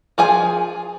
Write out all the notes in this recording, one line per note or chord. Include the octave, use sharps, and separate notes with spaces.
F3 G#4 G#5